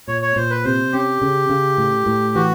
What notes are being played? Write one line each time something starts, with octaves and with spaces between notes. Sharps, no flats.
A#2 C#5
C#5
A#2 C5
B4
C3 C5
C#4 G4
C#3
C#3
A2
A2
E3 F#4